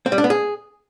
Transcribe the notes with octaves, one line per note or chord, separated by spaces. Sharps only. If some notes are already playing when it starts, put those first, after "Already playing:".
C4
G3
D4
B3
G#4